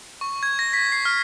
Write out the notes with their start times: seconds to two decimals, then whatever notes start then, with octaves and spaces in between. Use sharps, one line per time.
0.21 C#6
0.43 G#6
0.59 A#6
0.73 B6
0.92 C7
1.05 F6